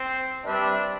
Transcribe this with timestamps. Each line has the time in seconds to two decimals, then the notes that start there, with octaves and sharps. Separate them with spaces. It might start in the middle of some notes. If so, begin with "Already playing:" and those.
Already playing: C4
0.44 G3 C4 D4 G4 B4 E5